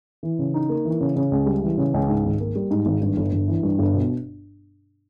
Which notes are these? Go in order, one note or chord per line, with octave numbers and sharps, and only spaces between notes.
E3
C#3
D#4
A#3
E3
C#3
C#3
C#2
G3
E3
C#3
C#2
G#2
G#1
A#3
G3
G#2
G#1
G2
G1
G1
E3
G2
G1
B2